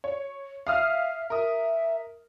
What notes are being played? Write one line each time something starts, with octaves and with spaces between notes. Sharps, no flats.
C#5
E5 F5 D#6 F6
A#4 E5 D#6